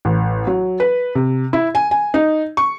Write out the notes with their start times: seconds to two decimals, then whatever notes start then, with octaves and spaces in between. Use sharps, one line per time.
0.05 A1
0.47 F#3
0.80 B4
1.15 C3
1.53 E4
1.75 G#5
1.91 G#5
2.14 D#4
2.57 C#6